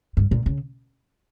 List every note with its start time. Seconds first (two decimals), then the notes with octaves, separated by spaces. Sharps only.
0.17 G2
0.31 A#2
0.46 C#3